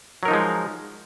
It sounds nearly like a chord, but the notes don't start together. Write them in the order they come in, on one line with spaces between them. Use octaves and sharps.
F#3 A#4 D#4 F3 G#3